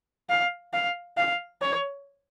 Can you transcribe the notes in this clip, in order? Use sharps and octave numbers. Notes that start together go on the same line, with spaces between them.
F5
F5
F5
C#5